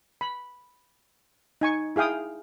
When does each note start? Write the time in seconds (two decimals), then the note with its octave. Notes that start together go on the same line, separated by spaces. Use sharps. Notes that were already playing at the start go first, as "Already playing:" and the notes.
0.21 B5
1.61 D#4 G#5 C#6
1.96 E4 G#4 F5 G5 D#6